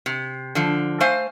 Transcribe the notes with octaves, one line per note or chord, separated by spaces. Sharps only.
C3
D3 F3
A3 C5 F5 G#5